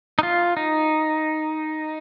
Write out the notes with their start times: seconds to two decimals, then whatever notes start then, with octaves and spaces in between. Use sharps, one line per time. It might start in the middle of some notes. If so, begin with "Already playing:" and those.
0.19 D#4
0.23 F4
0.57 D#4